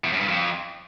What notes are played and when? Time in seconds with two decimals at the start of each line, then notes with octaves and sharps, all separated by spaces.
0.04 E2
0.12 F#2
0.20 G2
0.28 F2